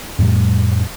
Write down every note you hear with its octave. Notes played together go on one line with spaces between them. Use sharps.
F2 A2 G3